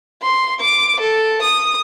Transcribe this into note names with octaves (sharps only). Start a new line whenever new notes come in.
C6
D6
A4
D#6